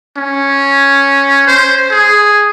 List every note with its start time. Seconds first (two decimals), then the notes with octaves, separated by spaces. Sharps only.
0.17 C#4
1.47 C5
1.91 G#4